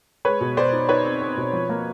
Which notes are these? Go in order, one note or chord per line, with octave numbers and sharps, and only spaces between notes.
G#3 B4 C#5
B2
B2 C5 D5
D#4
D#4 B4 C#5
C4
C4
B2
F3
A#3